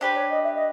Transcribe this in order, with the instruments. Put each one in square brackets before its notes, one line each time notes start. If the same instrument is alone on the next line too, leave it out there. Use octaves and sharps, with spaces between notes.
[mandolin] D4 G4 B4 [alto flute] C5
[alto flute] C#5
D#5
E5
D#5